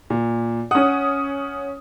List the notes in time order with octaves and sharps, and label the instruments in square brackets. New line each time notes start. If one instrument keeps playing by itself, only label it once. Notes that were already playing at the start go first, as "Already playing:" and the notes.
[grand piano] A#2
[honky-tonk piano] C#4 D#6 [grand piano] F#5